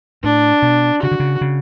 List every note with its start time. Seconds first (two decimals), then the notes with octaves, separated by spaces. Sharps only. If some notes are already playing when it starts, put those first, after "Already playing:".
0.24 A2 D4
0.62 B2
1.02 C#3 F#4
1.11 D3
1.20 C#3
1.41 C#3